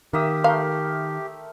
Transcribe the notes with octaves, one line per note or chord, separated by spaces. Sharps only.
D#3 A#3 G4 E5 D#6
A3 A#4 F5 C6